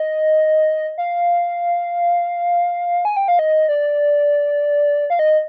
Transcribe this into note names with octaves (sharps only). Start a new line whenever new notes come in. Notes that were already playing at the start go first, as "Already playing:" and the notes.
Already playing: D#5
F5
G#5
G5
F5
D#5
D5
F5
D#5